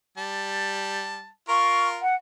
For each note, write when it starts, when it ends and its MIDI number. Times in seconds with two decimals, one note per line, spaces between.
0.18 1.29 55
0.18 1.29 81
1.49 2.02 65
1.49 2.02 70
1.49 1.89 85
2.02 2.15 78